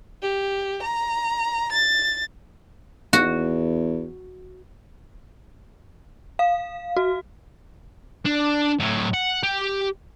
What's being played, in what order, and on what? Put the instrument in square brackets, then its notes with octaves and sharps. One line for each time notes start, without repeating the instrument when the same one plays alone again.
[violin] G4
A#5
A6
[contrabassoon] E2 [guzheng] F#4
[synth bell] F5
F#4
[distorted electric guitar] D4
A2 F#3
F#5
G4